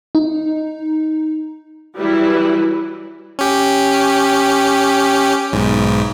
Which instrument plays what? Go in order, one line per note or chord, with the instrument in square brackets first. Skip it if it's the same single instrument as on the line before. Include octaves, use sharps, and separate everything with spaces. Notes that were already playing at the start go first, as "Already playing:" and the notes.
[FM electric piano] D#4
[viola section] E3 F#3 G3 E4 B4
[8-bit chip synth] C#4 G4
B1 G#2